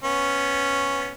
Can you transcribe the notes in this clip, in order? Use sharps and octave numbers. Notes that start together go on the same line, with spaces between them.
B3 C#4